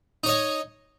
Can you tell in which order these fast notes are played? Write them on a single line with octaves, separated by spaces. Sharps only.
D#4 C#5 D#5